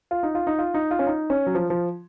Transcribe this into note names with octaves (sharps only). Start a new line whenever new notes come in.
F4
D#4
F4
D#4
F4
D#4
F4
C#4
D#4
C#4
F#3
F3
F3